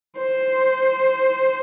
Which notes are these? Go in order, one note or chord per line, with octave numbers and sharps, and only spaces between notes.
C5